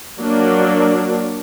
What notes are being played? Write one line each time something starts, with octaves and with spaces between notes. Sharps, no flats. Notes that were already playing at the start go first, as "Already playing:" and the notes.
F#3 A#3 D4